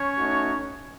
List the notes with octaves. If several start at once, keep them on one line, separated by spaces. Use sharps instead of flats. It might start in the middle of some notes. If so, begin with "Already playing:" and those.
Already playing: C#4 C#5
A3 D#4 F#4